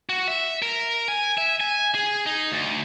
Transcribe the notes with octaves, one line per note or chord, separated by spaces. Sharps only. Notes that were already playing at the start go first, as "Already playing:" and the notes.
F#4
E5
A#4
G#5
E5
G#5
G#4
D#4
D2